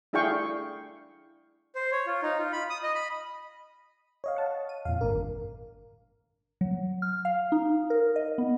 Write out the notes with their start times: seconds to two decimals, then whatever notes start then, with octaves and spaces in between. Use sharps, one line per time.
0.13 D4 E4 G#4 F5 G5 C#6
1.75 C5
1.92 C#5
2.06 F4
2.23 D#4
2.38 F4
2.52 B5
2.70 D#6
2.83 D#5
2.95 B5
4.24 C#5 D#5 F5
4.36 F#5 A5
4.69 D#7
4.85 F2 A#2 F5
5.01 G#1 D4 A#4
6.61 F#3
7.02 F6
7.25 F5
7.52 D#4
7.90 A#4
8.16 D#5
8.38 B3